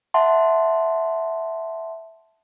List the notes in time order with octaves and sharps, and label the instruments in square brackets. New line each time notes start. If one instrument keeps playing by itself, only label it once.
[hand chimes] E5 F#5 A5 C6